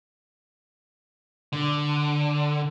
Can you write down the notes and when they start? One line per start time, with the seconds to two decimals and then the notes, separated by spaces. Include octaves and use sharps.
1.52 D3